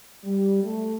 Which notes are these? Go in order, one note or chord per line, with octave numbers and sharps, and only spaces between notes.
G3
A3